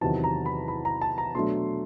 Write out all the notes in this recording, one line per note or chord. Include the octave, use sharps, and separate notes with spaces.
E2 C3 D#3 F#3 A5
A#5
B5
B5
A#5
A5
A#5
B2 F#3 A3 D4 C6